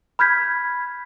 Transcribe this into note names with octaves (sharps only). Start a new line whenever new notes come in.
B5 F6 G6 G#6 B6